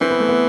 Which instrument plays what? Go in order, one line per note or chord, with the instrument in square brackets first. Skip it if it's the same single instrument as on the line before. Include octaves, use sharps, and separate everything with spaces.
[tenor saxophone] E3 [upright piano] C4
[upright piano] B3
A3
B3